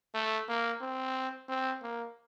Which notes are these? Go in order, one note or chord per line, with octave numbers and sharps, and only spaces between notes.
A3
A#3
C4
C4
A#3